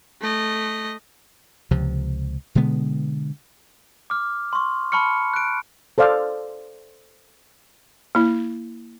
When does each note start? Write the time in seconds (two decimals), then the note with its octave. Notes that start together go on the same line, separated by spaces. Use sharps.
0.21 A3 D#5
1.71 C#2 C3 F3
2.55 B2 D3 G#3 B3
4.10 D6 F6
4.53 C6 C#6
4.92 A5 B5 C#6 F6 C#7
5.34 F#6 D7
5.98 A4 C5 D5 F5
8.15 A#3 E4